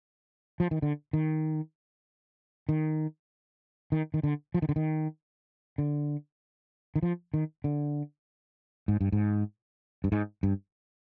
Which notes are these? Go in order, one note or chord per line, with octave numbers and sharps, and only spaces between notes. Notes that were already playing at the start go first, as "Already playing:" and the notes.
F3
D#3
D3
D#3
D#3
D#3
D#3
D3
F3
D#3
D3
D#3
D3
D#3
F3
D#3
D3
G#2
G2
G#2
G2
G#2
G2